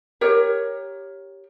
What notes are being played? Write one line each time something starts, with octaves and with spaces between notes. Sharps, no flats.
G4 A#4 C#5